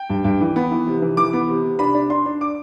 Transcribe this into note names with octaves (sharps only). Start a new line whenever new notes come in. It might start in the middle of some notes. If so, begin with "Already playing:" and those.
Already playing: G5
G2
G2
E3
B3
E3
C3
E3
E3 D6
B3
C3
C3
D4 B5
D4
D4 C6
D4
D6